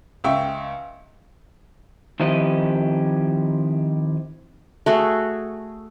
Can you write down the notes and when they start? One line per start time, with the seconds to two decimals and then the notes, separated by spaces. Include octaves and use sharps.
0.24 C#2 E5 G5 C#6
2.20 D#3 F3 C4 E4 G4 D#5
4.86 A3 F#4 G#4